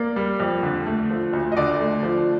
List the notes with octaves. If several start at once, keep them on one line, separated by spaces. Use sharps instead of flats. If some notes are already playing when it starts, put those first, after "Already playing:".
Already playing: A#3 D5
G3
F2
D3
A3
F3
D2
D#5
D3 D5
A3
F3